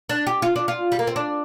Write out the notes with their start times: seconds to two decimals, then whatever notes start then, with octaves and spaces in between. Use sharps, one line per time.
0.10 D4
0.27 G4
0.42 F4
0.56 D4
0.68 F4
0.92 G3
0.99 A#3
1.07 C4
1.16 D4